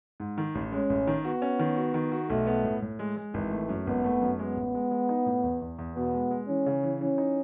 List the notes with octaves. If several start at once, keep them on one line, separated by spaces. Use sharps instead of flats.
G#2
D#3
A1
G#3 C#4
A1
D#3
B3 F#4
C#4
D#3
F#4
D#3
F#4
B1 A3
B3
A2
A2
G#3
G#3
G#1 E3
A3
F#2
G#1 B3
A3
F#2
G#3 B3
A1
G#3
G#3
D#4
A2
E2
E2
E2
B2 B3
G#3
G#3
E3 C#4
C#3
E3
E3 C#4
D#4